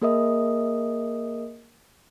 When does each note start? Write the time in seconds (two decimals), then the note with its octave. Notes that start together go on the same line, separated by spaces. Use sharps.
0.02 A#3 G#4 A#4 D#5 E5 D#6